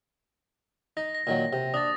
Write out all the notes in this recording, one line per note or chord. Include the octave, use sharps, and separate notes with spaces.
D#4 A#6
A#6
A#2 D#3 F#3
C3
D4 D#6 A6